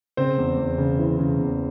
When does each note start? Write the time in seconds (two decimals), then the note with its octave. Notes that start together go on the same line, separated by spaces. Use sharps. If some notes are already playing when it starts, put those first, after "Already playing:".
0.17 C#3 C4 C5
0.38 E2
0.58 E2
0.78 C#3
0.99 E3
1.19 C#3
1.39 E2